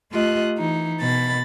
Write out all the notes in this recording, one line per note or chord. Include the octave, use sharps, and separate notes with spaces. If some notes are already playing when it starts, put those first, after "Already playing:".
A3 F4 G4 D#5 F#6
E3 D#4
B2 B5 A6